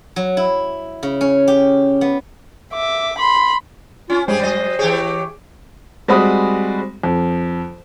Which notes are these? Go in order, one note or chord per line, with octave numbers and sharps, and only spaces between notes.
F#3
E4
C#3
C#4
G4
B3
E5 D6
B5 C6
C#4 F4
G2 G3 G#3 C#4 G4 G#4 C5
F#3 D#5
E3 G4 G#4 C#5
G3 G#3 C4 F#4 B5 D#6
F2